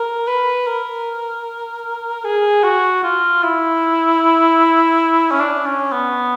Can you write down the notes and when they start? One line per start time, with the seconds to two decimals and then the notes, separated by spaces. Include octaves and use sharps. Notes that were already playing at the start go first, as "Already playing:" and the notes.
Already playing: A#4
0.27 B4
0.67 A#4
2.24 G#4
2.64 F#4
3.03 F4
3.43 E4
5.31 C#4
5.40 D4
5.65 C#4
5.92 B3